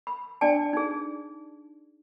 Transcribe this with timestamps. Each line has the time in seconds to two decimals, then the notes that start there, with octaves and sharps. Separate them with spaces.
0.07 B5
0.41 D4 D5 G5 A5
0.73 D#4 G#4